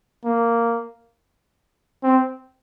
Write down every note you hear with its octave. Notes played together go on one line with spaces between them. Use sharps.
A#3
C4